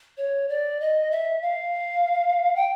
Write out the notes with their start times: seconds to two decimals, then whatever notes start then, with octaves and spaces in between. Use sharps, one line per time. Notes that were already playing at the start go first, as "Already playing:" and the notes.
0.17 C#5
0.49 D5
0.80 D#5
1.11 E5
1.42 F5
2.56 G5